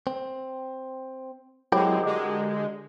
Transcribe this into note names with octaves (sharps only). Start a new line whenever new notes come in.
C4
F#3 G#3 C4 E4 F#4 G4 A#4 G5
D3 G#3 G4